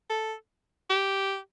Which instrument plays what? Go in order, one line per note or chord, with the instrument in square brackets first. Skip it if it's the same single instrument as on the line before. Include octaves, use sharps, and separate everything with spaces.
[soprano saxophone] A4
G4